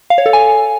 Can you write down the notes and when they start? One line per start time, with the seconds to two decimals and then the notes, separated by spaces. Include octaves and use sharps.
0.10 F5
0.18 C#5
0.26 A4
0.33 G#5